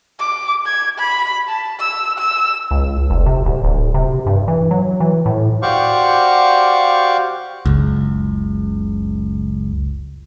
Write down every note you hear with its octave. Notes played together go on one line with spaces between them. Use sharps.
D6
G#6
B5
A5
E6
E6
C#2
F1
C3
D1
D1
C3
G2
E3
F#3
E3
A2
F#4 G4 C5 D5 F5 C#6
F#1 C#2